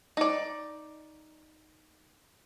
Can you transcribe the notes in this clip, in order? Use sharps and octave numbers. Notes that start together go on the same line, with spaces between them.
D#4 D5